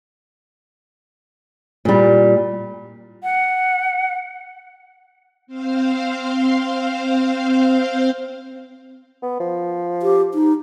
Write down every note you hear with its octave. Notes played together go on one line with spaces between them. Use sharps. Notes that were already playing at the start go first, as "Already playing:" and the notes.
A#2 G3
F#5
C4 C5 F5
B3
F3
G4
D#4